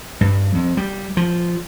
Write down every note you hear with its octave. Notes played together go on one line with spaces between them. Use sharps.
G2
F2
G3
F3